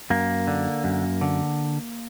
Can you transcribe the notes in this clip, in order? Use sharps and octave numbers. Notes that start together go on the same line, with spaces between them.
F#2 A#3
D3
F#2
D3